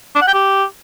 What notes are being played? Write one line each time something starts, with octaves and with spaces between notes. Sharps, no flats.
D4
F#5
G5
G4